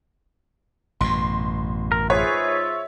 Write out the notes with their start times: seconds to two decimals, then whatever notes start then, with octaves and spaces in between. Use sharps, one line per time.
1.01 A1 F#2 B2 C6
1.92 A#4
2.10 G#2 F4 G#4 B4 C#5 E5